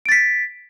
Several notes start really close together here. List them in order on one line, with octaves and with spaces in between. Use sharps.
D7 A6 B6